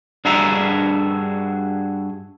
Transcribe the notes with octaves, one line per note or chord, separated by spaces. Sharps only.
G2 D4 F#4 G#4 E5 A#5